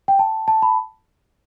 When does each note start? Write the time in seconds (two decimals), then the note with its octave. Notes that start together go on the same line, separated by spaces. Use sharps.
0.08 G5
0.19 A5
0.48 A5
0.62 B5